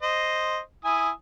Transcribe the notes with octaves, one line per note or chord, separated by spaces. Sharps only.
C5 D#5
E4 G#5 D#6